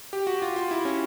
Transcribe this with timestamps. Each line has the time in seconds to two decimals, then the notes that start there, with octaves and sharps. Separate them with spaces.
0.13 G4
0.27 F#4
0.42 F4
0.56 F4
0.71 E4
0.85 C#4